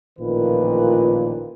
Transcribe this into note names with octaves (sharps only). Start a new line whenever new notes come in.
A1 A#2 D#3 F3 B4